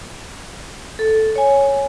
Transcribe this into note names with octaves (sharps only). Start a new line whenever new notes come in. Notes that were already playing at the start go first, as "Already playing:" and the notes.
A4
C#5 G#5